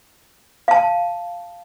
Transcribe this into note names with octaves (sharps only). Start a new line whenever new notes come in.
F5 A5